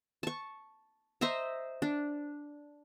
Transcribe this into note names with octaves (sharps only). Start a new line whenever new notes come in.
A5 C#6
C5 D#5 E5 A#5
D4